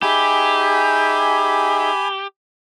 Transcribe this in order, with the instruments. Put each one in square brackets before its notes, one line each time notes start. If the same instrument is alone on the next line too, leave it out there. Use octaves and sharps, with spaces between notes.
[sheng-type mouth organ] D#4 G#4 E5 [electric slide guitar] G4 [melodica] G#5 B5